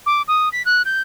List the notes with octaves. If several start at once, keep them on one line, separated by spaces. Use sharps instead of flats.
D6
D#6
B6
F#6
G6